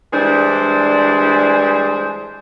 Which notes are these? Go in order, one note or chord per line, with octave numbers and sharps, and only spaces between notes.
E3 G3 G#3 D4 C5